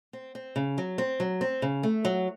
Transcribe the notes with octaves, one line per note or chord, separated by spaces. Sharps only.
C4
C4
C#3
F#3
C4
F#3
C4
C#3
A3
F#3